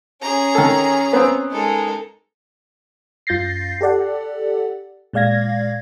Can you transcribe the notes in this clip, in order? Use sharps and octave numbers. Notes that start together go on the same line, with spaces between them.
C#4 G#4 A#5
D#3 A4
B3 C4
G#3 D#4 A4 A#4
F#2 F4 G6 A6 A#6 C7
G4 A4 D5 F#5
A#2 G#3 D5 F5 G#6 A#6